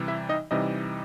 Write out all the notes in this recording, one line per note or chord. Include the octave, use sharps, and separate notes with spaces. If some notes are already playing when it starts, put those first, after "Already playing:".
Already playing: C3 E3 G3
E4 E5
D#4 D#5
C3 E3 G3 D#4 D#5